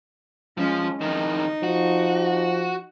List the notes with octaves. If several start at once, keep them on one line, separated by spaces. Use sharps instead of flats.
F3 G#3 C#4
F2 D#3 D#4
F3 F#4